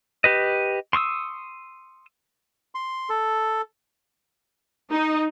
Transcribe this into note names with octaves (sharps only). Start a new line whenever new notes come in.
G4 B4 D#5
C6 C#6 D#6 E6
C6
A4
D#4